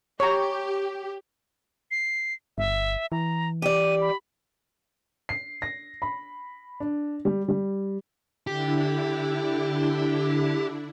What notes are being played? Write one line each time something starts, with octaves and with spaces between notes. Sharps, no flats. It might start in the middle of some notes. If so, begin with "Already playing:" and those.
G4 C#5 A#5
C7
G1 E5
E3 A#5
G4 D5 D#7
B5
C7
A#6
B5
D4
G3
G3
D3 D4 E4 G4